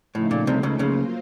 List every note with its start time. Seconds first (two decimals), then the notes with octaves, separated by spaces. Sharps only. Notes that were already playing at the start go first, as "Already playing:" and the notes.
0.14 A2 C#3 F3 A3 D#4
0.31 A#2
0.47 C2 C3
0.63 C#2 C#3
0.79 C#2 C#3 F#3 A#3 F4 C5